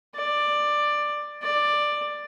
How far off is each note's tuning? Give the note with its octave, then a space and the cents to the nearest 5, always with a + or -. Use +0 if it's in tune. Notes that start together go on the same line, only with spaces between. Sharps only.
D5 +10
D5 +10